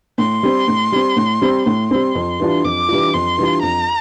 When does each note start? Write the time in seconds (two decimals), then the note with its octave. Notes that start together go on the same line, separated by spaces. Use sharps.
0.18 A2 C6
0.43 G3 C4
0.68 A2
0.92 G3 C4
1.16 A2
1.41 G3 C4
1.66 A2 C6
1.91 G3 C4
2.15 F2
2.40 E3 G3 D4 F4
2.64 F2 D6
2.88 E3 G3 D4 F4
3.13 F2 C6
3.38 E3 G3 D4 F4
3.62 F2 A#5